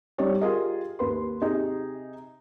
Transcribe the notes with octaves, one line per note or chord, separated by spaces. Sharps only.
G3 C4 D#4 G4 C#5 D5
F4 G4 G#4 A#4 D#5
D#2 B4 C6
C3 D#4 G4 G#4